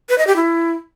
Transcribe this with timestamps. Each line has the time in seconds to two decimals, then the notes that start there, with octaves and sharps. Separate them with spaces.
0.09 B4
0.18 D#5
0.27 G4
0.36 E4